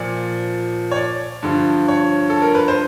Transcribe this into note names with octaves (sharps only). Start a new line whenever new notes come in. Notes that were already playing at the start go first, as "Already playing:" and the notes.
Already playing: A#2 F3 D5
C#5
D5
G2 D3 F3
C#5
A4
A#4
B4
C5